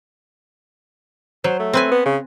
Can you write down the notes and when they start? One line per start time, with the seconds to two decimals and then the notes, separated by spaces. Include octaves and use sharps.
1.44 F#3 C5
1.59 A3
1.73 C4 B4 G#5
1.91 B3
2.05 C#3